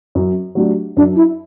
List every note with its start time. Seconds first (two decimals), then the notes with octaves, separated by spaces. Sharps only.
0.15 F#2
0.55 F#3 A3 D4 G4
0.97 F#2 D4
1.16 E4